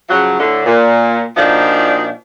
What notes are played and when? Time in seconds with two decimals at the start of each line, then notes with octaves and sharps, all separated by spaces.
0.09 C#3 F3 F#3
0.40 A2 D3
0.66 A#2
1.36 A#2 F3 D4 D#4 F#4